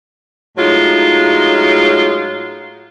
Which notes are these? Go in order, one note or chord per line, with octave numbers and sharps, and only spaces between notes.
A2 F#3 G#3 D#4 F4